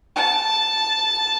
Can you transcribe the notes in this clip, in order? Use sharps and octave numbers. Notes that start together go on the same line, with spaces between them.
A5